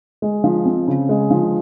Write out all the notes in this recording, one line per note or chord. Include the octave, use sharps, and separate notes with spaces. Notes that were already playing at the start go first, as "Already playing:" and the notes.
G#3
F3
C4
C#3
G#3
F3